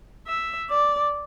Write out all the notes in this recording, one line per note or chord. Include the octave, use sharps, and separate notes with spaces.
E5
D5